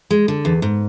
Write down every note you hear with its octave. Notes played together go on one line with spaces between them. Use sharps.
G#3
D3
E2
G#2